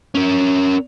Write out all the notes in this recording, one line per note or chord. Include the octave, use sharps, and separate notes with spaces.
C#4 A#4